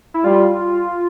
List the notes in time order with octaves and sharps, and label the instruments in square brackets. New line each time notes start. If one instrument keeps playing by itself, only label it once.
[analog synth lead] E4
[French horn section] G3 [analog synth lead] F4